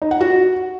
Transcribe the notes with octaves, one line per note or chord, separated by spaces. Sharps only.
D#4
F#5
F#4